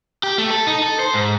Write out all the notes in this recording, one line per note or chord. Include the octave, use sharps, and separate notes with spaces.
G4
A3
A4
D#4
A4
C5
G#2